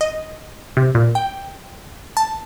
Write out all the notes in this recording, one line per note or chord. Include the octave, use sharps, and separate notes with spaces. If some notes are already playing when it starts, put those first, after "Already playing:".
D#5
C3
A#2
G5
A5